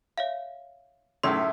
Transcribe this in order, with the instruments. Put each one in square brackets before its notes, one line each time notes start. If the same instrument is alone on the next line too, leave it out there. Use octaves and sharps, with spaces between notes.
[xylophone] C#5 E5 F5
[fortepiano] C#2 F#2 A2 [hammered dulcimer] E5 [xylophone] C6